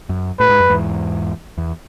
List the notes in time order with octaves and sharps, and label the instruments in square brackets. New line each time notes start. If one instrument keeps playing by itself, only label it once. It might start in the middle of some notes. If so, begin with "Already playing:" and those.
[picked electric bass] F#2
[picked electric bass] A2 [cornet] B4
[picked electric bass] G#2
F#2
E2 G#2
E2